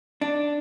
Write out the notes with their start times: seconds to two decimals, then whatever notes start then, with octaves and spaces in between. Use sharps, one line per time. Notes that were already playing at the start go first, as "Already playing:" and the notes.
0.21 D4